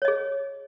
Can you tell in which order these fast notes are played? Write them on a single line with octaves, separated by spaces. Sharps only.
C#5 D#5 G#4